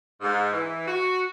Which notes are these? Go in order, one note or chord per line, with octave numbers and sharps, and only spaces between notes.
G#2
E3
F#4